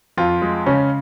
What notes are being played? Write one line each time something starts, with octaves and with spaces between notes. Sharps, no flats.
F2 F4
G#3
C#3 C#4